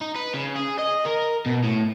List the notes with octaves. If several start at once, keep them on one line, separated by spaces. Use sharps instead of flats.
D#4
B4
C#3
G#4
D#5
A#4
B2
A2